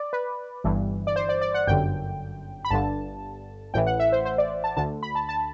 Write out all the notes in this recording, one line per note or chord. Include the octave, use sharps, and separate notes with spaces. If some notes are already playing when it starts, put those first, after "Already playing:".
Already playing: D5
B4
G1 G2 E3
D5
C5
D5
D5
F#5
G1 F#2 D3 G5
B5
G1 G2 D3 A5
A1 A2 E3 G5
F#5
E5
C5
C5
D5
A5
D2 D3 A5
B5
A5
A5